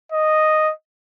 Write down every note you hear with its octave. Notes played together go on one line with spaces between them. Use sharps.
D#5